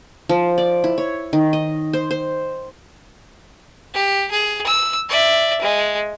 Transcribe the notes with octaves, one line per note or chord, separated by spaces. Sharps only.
F3
D5
E4
C#5
D#3
D#5
C5
C5
G4
G#4
E6
D5 E5
G#3